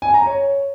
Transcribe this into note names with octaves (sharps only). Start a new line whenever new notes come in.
G#5
A#5
C#5